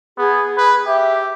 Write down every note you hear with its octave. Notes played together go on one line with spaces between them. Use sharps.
B3 G#4
B4
G4 E5